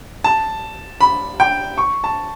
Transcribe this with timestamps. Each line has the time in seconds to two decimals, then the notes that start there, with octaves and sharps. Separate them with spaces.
0.24 A5
1.01 B5
1.40 G5
1.78 C#6
2.04 A5